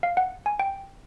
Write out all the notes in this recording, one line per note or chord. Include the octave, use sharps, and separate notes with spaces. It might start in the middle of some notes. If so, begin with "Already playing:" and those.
F5
F#5
G#5
G5